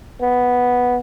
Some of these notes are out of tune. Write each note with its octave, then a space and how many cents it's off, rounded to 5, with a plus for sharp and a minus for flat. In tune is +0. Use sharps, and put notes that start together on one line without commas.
B3 -5